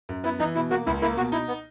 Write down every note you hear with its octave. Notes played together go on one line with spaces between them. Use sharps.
F#2
B3 E4
E3 D#4
B2 E4
A#3 F#4
C#2 E4
A#3 E4
B2 F#4
D#4 E4
B3